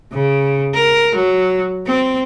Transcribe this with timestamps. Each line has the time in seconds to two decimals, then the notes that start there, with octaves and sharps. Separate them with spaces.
0.13 C#3
0.74 A#4
1.15 F#3
1.86 C4